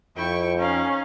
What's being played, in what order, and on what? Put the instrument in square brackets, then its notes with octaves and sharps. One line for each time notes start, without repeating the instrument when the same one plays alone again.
[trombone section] F2 [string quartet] E4 G5 C#6
[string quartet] C#4 D#4 F5